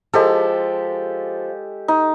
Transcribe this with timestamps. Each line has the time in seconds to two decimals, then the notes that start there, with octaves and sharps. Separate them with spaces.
0.13 F3 G#3 G4 A4
1.88 D#4